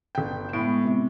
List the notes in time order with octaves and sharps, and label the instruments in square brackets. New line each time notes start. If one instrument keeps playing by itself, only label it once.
[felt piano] G1 G5
[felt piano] A2 [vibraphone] G#3 B3
[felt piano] C3